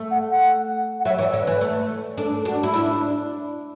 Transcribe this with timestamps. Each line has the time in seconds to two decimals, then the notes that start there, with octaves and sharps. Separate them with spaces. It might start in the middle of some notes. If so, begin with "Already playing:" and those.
Already playing: A3
0.11 F#5
0.29 F#5
1.00 F#5
1.05 F#3 E5
1.19 E3
1.24 D5
1.34 D3
1.42 B4
1.47 E3
1.61 A3
2.18 D4 A4
2.42 A4
2.45 D4 F#4
2.63 E4
2.73 D4 E4